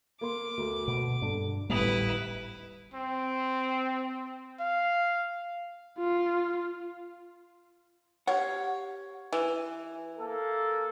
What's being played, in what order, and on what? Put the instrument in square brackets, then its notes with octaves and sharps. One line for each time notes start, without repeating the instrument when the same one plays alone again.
[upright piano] A#3 C6 [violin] D6
[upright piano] D2
[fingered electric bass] B2
[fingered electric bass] G2 D4 [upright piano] D3
[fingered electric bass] D1 G#1 A2 [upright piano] G3 D#6 [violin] E4 B4
[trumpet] C4
F5
[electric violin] F4
[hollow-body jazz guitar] G4 F5 F#5 [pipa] C#5
[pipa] E3
[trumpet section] A#3 A4